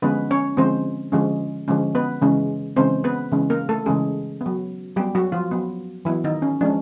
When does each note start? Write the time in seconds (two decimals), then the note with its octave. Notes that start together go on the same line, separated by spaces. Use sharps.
0.02 D3 F3 G#3 B3 C#4 B4
0.31 C#4 C#5
0.57 D3 F3 G#3 C4 C#4 C5
1.12 D3 F3 G#3 C#4
1.68 D3 F3 G#3 C#4
1.95 B3 B4
2.22 C#3 E3 G#3 C#4
2.76 C#3 E3 G#3 C4 C#4 C5
3.04 B3 B4
3.31 C#3 E3 G#3 C#4
3.50 A#3 A#4
3.69 A3 A4
3.86 C#3 E3 G#3 C#4 G#4
4.41 B3
4.46 F#3
4.96 F#3 G3 B3 G4
5.15 F#3 F#4
5.32 F3 F4
5.51 F#3 B3
6.05 E3 F#3 B3 E4
6.24 D#3 D#4
6.42 C#4
6.61 F3 G#3 C#4 D4